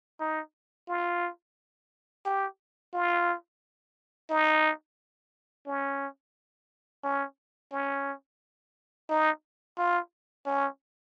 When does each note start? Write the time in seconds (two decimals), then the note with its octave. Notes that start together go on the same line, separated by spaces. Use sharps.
0.20 D#4
0.88 F4
2.25 G4
2.94 F4
4.30 D#4
5.66 C#4
7.04 C#4
7.72 C#4
9.10 D#4
9.78 F4
10.46 C#4